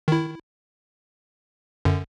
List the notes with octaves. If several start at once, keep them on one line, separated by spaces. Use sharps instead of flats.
D#3 E4
F#2 D3